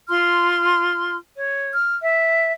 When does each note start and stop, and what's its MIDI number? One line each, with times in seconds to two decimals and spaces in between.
0.09 1.16 65
0.09 1.16 84
0.09 1.16 89
1.36 1.71 73
1.73 1.95 89
2.01 2.52 76